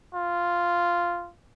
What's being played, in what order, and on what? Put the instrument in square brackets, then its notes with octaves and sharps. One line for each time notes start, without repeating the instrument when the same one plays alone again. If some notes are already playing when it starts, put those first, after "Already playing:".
[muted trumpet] F4